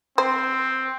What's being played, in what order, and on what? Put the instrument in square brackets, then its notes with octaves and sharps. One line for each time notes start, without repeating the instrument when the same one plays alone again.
[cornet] C4 [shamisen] C5